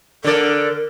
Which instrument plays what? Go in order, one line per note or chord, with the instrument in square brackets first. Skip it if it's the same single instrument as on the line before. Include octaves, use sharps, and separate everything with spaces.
[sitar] D3 D5 [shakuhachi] A#4